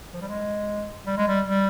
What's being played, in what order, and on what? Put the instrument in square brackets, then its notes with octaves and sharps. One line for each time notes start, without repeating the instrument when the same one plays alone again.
[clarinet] F3
G3
G#3
G3
G#3
G3
G3